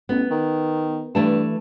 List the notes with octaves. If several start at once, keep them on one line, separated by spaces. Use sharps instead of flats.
A1 B3
D#3
G2 E3 A3 A5